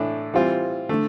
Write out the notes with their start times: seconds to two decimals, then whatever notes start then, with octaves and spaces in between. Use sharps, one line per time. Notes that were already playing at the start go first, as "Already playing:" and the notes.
Already playing: A2 E3 A3 D4
0.34 E3 G3 C4 F4
0.89 D3 A3